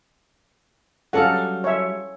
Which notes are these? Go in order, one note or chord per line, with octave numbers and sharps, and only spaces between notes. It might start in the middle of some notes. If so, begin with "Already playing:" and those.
F#3 G3 C#4 A4 F5 F#5
C#5 E5